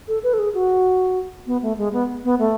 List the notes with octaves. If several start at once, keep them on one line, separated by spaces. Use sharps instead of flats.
A4
B4
A4
G#4
F#4
B3
A3
G#3
B3
B3
A3